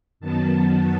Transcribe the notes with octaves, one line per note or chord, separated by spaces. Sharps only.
F#2 D#3 F#3 B3 A5